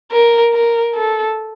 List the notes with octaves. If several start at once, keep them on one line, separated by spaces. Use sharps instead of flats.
A#4
A#4
A4